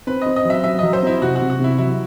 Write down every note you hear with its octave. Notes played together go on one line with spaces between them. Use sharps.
C4 B4
C4 D#5
D#5
F#3
E5
F#3 E5
F#3 D#5
C5
C4 E4
C3 F#4
F#4
C3
F#4
C3 E4
F#3 E4